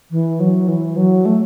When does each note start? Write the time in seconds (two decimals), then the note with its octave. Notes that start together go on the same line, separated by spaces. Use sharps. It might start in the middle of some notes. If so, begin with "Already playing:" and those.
0.11 E3
0.40 F#3
0.68 E3
0.97 F#3
1.25 A3